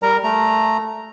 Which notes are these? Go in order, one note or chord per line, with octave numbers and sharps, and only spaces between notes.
G3 A#4 A#5
A3 A#5